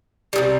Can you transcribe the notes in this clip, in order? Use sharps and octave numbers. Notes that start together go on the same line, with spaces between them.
C3 D#3 G3